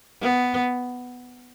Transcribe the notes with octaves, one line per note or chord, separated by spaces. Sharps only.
B3